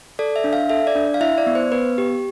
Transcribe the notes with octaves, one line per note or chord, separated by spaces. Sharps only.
A4 D5
E5
D4
F5
A4 E5
D5
D4
F5
E4 E5
D5
B3
C5
B3 B4
G4